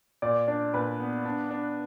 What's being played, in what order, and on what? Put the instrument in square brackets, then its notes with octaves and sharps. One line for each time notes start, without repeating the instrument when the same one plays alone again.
[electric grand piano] A#2 [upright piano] D5
[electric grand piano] D4 [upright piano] D5
[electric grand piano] A#2 [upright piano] B4
[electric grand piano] B3
D4
D4